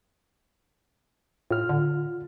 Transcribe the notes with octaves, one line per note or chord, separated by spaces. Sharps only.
A2 F4 F6
D3